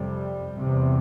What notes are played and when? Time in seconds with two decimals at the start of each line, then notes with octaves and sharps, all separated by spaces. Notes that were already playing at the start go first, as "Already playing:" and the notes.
Already playing: F2 C3 G3
0.57 E2 C3